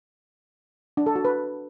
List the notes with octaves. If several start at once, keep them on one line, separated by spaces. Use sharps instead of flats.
D4
A4
F#4
B4